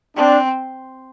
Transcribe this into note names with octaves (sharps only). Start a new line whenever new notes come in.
C4 D4